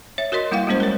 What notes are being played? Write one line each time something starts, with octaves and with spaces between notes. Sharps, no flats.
C#5 E5
F#4 A#4 C#5 D#5 C6
G3 A#3 E4 F5 G5
G3 G#3 A#3 C#4 C5
A#4 C#5